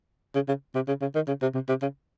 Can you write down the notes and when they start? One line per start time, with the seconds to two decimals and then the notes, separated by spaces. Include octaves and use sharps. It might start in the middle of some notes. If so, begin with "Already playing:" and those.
0.35 C#3
0.48 C#3
0.75 C3
0.88 C#3
1.01 C#3
1.15 D#3
1.28 C#3
1.42 C3
1.54 C3
1.69 C3
1.82 C#3